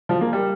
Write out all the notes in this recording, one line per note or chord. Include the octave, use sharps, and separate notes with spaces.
F3
A#3
G3